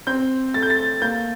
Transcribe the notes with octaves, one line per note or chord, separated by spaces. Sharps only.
C4 G6
A3 A6
G6
A6
A#3 G6